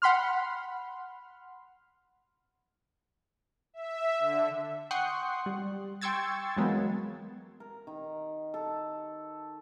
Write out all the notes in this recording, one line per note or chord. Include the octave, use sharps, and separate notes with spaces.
F#5 B5 C6 F6
E5
D3
F#5 G5 C6 C#6 D#6 F#6
G3
G5 C6 C#6 E6 G#6 A6
E3 F#3 G#3 A#3 B3
A#4
D#3
A4